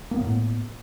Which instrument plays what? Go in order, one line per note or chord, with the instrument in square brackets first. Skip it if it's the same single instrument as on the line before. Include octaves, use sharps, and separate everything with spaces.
[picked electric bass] A#3
B3
A2